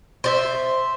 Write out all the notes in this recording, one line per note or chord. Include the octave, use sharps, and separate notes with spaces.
C5 D5 E5